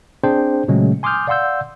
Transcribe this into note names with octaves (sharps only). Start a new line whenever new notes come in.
C4 D4 G#4 C5 G5
A#2 C#3 F#3 G#3 A3 C#4
G#5 C6 D6 D#6 F6 G6
D5 F5 F#5 C6 E6 G6